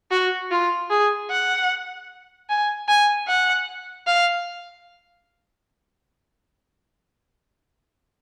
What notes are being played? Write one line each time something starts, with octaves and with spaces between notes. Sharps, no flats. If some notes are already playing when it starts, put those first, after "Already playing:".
F#4
F4
G#4
F#5
G#5
G#5
F#5
F5